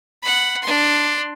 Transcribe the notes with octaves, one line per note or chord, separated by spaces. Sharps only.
F#5 B5
D4 C6